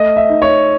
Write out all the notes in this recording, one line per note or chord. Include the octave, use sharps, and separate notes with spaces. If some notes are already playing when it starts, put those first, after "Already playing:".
Already playing: A3 D#5
E5
D#4
C#5